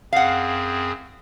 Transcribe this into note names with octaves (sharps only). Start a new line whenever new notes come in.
F#2 C4 G#4 F5 F#5